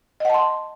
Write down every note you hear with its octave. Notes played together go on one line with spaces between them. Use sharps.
D#5 F#5 A5 C6